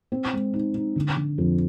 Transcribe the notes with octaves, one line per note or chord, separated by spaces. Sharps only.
C4
G#3
D#4
D#4
D3
D3
F2